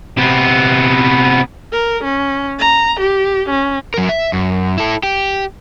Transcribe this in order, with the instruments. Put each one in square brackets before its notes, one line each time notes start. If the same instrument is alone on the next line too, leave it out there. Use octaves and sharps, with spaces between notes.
[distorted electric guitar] C3 B3
[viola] A#4
C#4
A#5
G4
C#4
[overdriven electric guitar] F#3 A#4
E5
F#2
E4 A4
G4